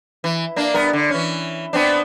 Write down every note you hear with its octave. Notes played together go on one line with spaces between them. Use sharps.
E3
A#3 D4
G2 B3 A#4
D3
E3 C#4
B3 C4 D4